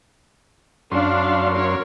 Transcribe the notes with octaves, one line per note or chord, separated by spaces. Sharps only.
F#2 C#4 D4 F5 C6
A#4 C#5